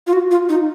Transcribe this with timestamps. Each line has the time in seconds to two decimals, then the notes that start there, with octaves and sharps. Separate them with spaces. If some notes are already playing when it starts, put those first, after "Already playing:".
0.07 F4
0.13 F#4
0.31 F4
0.49 D#4